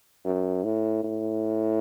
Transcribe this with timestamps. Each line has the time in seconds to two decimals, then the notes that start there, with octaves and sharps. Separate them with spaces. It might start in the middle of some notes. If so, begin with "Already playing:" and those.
0.25 F#2
0.64 A2
1.03 A2